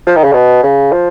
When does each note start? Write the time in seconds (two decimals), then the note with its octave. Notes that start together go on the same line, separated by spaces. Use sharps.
0.07 F3
0.16 D#3
0.24 C#3
0.33 B2
0.63 C#3
0.92 F3